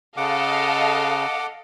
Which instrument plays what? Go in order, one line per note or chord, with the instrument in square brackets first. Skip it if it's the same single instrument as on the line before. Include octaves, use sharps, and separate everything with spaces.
[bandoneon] C#3 [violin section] A4 D#5 F5 [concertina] F#5 D6